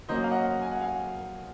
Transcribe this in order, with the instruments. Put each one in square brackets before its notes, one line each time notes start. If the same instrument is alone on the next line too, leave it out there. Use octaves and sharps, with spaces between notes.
[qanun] F#3 A#3 C#4 [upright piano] C5 D#5
[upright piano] F5
D#5 F#5
G#5
F#5
F5 G#5